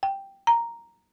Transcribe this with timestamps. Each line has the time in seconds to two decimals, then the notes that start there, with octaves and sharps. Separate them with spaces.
0.03 G5
0.47 A#5